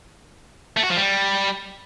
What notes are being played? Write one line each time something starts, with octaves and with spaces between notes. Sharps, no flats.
A3
F#4
F3
G3